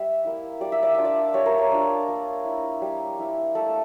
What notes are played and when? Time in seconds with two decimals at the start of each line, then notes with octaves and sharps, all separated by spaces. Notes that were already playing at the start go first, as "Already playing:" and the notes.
Already playing: G3 E5
0.25 A#3 E4
0.61 G3 D5
0.72 E5
0.83 D5
0.94 D4 F4 E5
1.05 D5
1.34 G3 C#5
1.46 A#4
1.58 C#5
1.72 D4 F4
2.08 A#3
2.45 E4
2.82 G3
3.19 A#3 E4
3.55 A3 A4